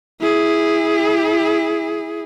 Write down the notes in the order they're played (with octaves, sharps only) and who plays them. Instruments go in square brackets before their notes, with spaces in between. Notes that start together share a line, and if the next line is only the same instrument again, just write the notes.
[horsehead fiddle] E4 G#4